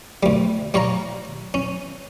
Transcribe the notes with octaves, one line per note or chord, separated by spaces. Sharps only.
D2 G3
G3 C#5 F5 A#5
C#4